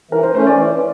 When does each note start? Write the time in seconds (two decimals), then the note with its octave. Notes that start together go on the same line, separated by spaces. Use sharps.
0.11 E3 A#4
0.23 C5
0.35 A3 C#4 C5
0.47 D5
0.58 E3